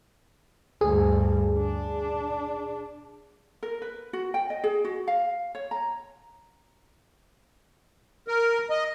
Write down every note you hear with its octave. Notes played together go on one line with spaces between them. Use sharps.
D2 G2 G#4
D4
A#4
B4
F#4
G5
D#5
G#4
F#4
F5
C#5
A#5
A#4
D#5